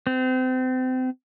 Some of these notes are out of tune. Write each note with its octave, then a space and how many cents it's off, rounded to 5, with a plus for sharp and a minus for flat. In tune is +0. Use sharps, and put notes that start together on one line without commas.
C4 -30